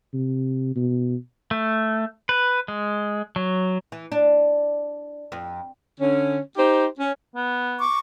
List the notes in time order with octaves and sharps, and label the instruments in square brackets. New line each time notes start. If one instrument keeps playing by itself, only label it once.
[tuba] C3
B2
[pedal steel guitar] A3
B4
G#3
F#3
[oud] E3
D4
F2
[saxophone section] D3 C#4
D#4 G4 C5
C#4
[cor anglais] B3
[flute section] C#6 D6